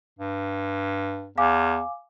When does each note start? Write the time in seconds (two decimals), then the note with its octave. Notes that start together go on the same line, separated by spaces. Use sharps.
0.19 G2
1.38 E2 F5 G#5 D6